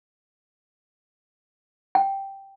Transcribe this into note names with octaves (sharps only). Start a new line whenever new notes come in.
G5